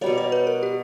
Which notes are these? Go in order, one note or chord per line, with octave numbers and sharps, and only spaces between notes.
B2 G3 A#3 C#5
C#5
B4
A#4
G4